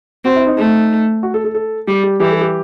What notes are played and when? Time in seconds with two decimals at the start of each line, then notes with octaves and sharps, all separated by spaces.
0.24 C4 F#4
0.36 E4
0.47 D#4
0.57 A3 D#4
1.23 F#4
1.34 A4
1.44 A4
1.55 A4
1.87 G3 G4
2.03 G4
2.20 E3 G4
2.31 A4
2.41 G4